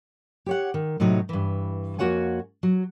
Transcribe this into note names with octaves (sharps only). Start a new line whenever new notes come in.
G4 C#5 F#5
D#3
A2 C3 F#3 D#4 C#5
G2 E3
F2 A#3 F#4 C#5 F#5 G#5
F#3